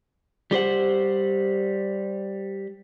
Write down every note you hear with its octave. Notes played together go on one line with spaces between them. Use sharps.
G3 G4 C5 F#5